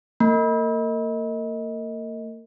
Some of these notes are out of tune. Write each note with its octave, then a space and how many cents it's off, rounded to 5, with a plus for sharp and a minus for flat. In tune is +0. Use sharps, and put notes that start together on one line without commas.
A#3 -35